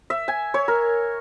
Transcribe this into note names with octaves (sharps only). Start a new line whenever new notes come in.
E5
G#5
C#5
A#4